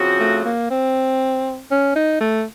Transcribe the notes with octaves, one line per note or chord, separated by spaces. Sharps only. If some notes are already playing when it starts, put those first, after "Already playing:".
Already playing: C#3 F3 C4 F#4
A3
A#3
C4
C#4
D#4
A3